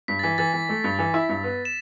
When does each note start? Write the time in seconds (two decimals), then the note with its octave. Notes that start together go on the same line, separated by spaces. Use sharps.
0.08 G2 B6
0.19 A6
0.23 E3 B6
0.38 E3 A6
0.54 E3
0.69 A3
0.84 G2
0.99 E3
1.14 E4
1.29 G2
1.44 B3
1.65 E7